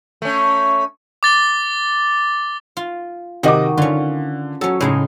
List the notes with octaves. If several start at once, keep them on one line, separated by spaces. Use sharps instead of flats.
A3 C#4
D6 A6 G7
F4
C3 D#3 F#4 D#5 D6
D3 C#4 F4
F#3 C#4 A4
A2 C#3 G#3 D#4